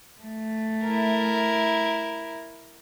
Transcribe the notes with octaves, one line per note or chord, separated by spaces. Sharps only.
A3
E4 A#4